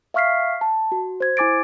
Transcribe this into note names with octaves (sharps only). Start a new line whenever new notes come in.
E5 F5 C#6 F6 B6 C7
A5
F#4
C5 G#6
E4 G#5 D6 A6 D7